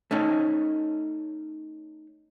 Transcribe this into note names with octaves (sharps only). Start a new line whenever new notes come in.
A3 C#4 D#4